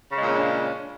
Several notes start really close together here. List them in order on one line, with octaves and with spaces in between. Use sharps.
C#3 G#3 A#2 C#4 D4